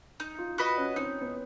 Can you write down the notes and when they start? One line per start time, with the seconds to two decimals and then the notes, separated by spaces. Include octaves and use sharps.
0.20 D#4
0.39 F4
0.58 F#4 B4 D#5
0.78 C#4
0.96 C4 D#4
1.21 B3